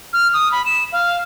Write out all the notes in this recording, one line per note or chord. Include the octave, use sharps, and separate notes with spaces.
F6
D#6
B5
E7
F5